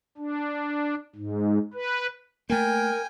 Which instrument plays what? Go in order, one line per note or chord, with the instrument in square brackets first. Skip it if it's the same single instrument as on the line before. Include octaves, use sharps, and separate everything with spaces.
[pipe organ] D4
G#2
B4
[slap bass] A3 A#3 [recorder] A#4 [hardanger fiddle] G5 G#5